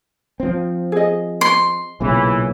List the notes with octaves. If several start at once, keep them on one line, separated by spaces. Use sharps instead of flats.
F3 C4
G#4 D#5
C6
B1 A#2 C#3 E3